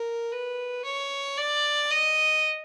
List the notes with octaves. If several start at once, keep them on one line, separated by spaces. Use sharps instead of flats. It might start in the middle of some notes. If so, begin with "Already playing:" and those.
Already playing: A#4
B4
C#5
D5
D#5